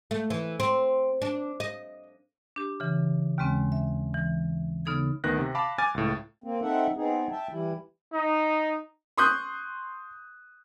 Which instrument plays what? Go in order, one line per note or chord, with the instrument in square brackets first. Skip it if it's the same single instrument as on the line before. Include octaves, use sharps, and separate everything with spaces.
[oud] A3
E3
C4
D4
D#5
[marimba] D4 G4
C#3 E3
D#2 C#3 G#3 C4 C#4
E5
E3
C#3 B3 D#4 A4 G#6
[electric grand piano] D2 D#3 B3 F#6 A#6
C3
F5 A5 B5 D6
G#5 D6 F6 A6
C#2 A2
[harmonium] A#3 C4
C4 D#4 A4 E5 F#5
B3 C4 D#4 G#4
E5 G5 A5
E3 G3 E4
[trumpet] D#4
[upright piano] C6 C#6 D#6 F#6 G6